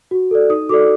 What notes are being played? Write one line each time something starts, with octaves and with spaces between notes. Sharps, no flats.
F#4
A4 D5
D#4 D#6
F#4 A4 D5 D6